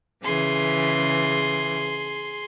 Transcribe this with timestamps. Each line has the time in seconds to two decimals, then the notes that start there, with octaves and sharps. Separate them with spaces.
0.24 C#3 E3 G#4 C6